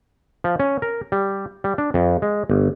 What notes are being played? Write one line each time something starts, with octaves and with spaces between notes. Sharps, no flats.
F3
C#4
A#4
G3
G3
D4
F2
G#3
G1